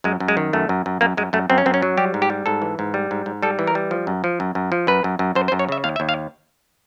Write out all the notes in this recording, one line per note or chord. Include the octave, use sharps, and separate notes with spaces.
F#2 G#3
F#2
G#3
D#3
F#2 A3
F#2
F#2
F#2 A#3
F#2 G#3
F#2 A3
F#2 C4
C#4
F#2 C4
C#4
F#3
G3 G4
G#2
G4
G3
G#2 A4
E3
G#2
G3
G#2
G#2
G3 A4
E3
A#4
G3
F3
F#2
F3
F#2
F#2
F3
F#2 B4
F#2
F#2
F#2 C5
C5
F#2
C#5
C#3 E5
D#2 F5
E5
D#2
F5